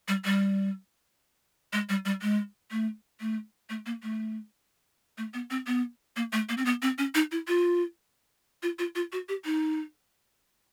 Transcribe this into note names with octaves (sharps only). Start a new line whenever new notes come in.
G3
G3
G#3
G3
G3
G#3
A3
A3
A3
A#3
A3
A3
B3
C4
B3
A#3
A3
A#3
C4
B3
C4
C#4
D#4
E4
F4
F4
F4
F4
F#4
G4
D#4